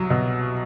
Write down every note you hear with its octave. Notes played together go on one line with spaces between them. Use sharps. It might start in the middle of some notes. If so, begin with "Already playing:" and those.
Already playing: C2 F#3
B2